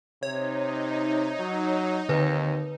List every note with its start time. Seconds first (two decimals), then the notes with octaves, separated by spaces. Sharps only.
0.23 C3 D#4 C#5
1.39 F#3
2.09 D#2 D3 B4